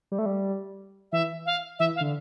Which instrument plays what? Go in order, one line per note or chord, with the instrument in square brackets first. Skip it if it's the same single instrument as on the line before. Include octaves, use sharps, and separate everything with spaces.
[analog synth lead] G3
A3
G3
[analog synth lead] E3 [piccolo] E5
[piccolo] F5
[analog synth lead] E3 [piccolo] E5
[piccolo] F5
[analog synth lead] D3